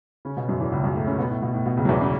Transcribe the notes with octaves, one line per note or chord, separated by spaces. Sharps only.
C#3 C#4
B2 B3
F#2 F#3
E2 E3
C#2 C#3
F#2 F#3
A2 A3
C#3 C#4
B2 B3
A2
B2
A2
B2
C#2 C#3
F#3
E2 E3
C#3 C#4